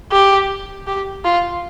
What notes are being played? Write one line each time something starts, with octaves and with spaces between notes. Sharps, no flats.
G4
G4
F4